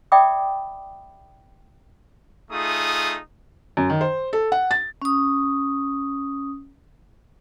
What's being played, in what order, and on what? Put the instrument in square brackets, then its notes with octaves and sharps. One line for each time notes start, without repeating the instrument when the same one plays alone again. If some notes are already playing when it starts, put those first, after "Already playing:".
[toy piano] D5 E5 G5 B5 D6 D#6
[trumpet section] A3 D#4 F4 G#4 D#6
[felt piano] F#2
D#3
C5
A4
F#5
A6
[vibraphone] C#4 D#6